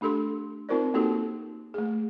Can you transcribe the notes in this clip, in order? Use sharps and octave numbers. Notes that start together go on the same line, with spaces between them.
A3 D4 G4 A4 C6
C4 D#4 F4 A#4 C5 D5
A#3 C4 D#4 F#4 G4 A4
A3 G#4